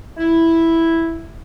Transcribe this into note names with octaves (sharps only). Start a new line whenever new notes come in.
E4